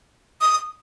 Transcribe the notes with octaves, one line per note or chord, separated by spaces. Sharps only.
D#6